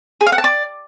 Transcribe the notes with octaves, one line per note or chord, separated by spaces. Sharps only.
G#4
F5
F#5
A5
D5